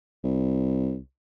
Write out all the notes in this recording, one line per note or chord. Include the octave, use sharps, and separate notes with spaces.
C2